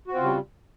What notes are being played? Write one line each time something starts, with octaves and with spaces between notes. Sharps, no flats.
C#3 G3 C4 F4 F#4